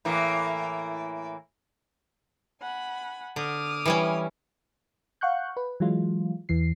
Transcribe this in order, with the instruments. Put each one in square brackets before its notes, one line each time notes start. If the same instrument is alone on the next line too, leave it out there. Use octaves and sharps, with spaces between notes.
[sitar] A2 E3 A#3
[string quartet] F#5 G#5 B5
[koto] D3 [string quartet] D6 D#6 F6
[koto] E3 G3 C#4
[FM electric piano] F5 F#5 C#6 F#6 G6
B4
E3 F#3 G#3 F4
E2 E3 C7